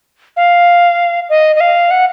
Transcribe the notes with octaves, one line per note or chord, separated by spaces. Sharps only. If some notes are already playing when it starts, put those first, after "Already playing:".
F5
D#5
D#5
F5
F#5